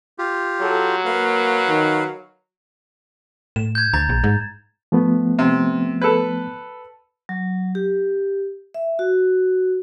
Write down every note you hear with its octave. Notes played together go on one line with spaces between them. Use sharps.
F4 G4
F#3 A4
A#3 B4 F5
D#3
A2 E7
G6 G#6
D2 A#5 A6
A#1
G#2
F3 A3 B3
C3
A4 B4
F#3
G4
E5
F#4